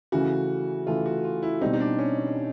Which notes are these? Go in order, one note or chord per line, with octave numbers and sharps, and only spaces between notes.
C#3 E3 A3 F#4
C#3 E3 A3 F4
F#4
F4
E4
B2 G3 C4 D#4
D#4
D4
C#4